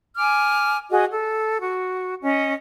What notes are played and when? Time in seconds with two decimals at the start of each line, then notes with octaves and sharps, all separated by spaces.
0.17 G#5 D6 F6
0.91 F#4 G#4 D#5
1.11 A4
1.61 F#4
2.22 C#4 D#5